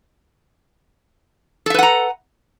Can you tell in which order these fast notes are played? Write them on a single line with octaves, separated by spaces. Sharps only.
A4 E5 B4 F#5 A#5